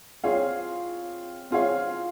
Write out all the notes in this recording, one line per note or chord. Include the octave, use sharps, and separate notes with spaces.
C4 F4 G#4 C#5 F5
C4 F4 G#4 C#5 F5